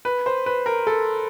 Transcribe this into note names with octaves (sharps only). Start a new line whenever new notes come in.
B4
C5
B4
A#4
A4